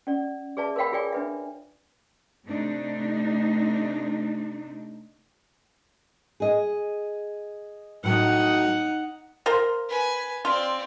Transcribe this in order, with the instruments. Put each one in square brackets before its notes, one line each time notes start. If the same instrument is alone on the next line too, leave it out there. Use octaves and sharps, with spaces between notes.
[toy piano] C#4 D5
G#4 B4 D5 E5 A5
A#4 B4 C#5 F5 G5 B5
F4 G#4 A4 D5 G5 G#5
D4 B4 E5
[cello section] C3 A3 D4 D#4
[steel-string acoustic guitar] G#4 D#5
[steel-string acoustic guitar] A2 F#3 [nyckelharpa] D#4 F#5
[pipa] F4 A#4 C5
[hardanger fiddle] B4 G#5
[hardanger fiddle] C4 D5 [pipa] F4